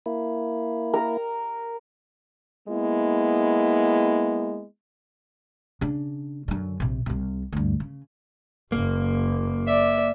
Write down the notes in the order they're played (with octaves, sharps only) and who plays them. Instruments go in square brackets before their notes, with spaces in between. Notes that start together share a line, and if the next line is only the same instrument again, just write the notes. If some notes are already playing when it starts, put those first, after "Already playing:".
[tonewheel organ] A#3 E4
[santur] A#4
[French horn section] G#3 A#3 B3 E4
[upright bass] C#3 D4
F#2 D3
A#1 C3
C2 C3
D2 G2
C#3
[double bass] F#1 [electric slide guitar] A#3
[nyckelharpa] D5 [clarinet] E5